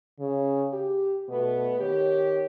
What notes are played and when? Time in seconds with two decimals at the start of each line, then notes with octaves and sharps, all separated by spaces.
0.20 C#3
0.73 G4
1.29 B2 A3 B3
1.80 D#3 G4 C#5